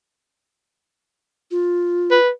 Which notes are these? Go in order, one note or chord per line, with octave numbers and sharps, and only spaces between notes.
F4
B4